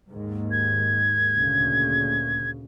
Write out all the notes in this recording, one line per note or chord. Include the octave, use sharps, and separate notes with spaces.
D#2 G#2
G#6
D2 A#2 C#3